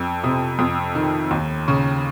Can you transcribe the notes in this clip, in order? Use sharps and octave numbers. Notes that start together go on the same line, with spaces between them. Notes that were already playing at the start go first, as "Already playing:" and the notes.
Already playing: F2
C3 D#6
F2 D#6
D#3
D#2
C#3 C#6